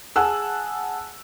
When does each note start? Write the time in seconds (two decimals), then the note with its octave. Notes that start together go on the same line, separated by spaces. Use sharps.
0.16 G#4 F#5 G#5 A5 E6 F#6